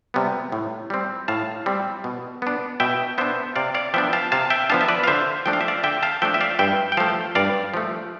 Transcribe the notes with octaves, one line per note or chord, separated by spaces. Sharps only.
C3 G3 B3
A2
G3 C4
A2 F5 A5
G3 C4
B2
B3 D4
B2 E5 G5
B3 D4 C5 E5
C3 D5 F5
D5 F5
F3 B3 D4 E5 G5
F5 A5
C3 F5 A5
E5 G5
F3 B3 D4 F5 A5
E5
B4 D5
F5
D3 C5 E5
F3 A3 D4 G5
F5
E5
D5 F5
D3 E5 G5
F5 A5
F3 A3 D4 E5 G5
E5
D5 F5
G2 E5 G5
G5
F3 A3 F5 A5
G2 D5 F5
F3 A3